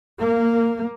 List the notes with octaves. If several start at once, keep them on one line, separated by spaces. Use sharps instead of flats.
A#3